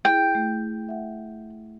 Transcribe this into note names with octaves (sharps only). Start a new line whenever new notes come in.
E4 G#4 G5
A3
E5 F#5